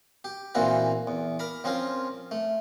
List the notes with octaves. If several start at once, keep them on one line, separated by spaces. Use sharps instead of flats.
G4
A#2 E3 A#3 C4 E4 F#4
E2
A#4 A#5 B5 D6
F3 C4 C#4 F4 A#4
A3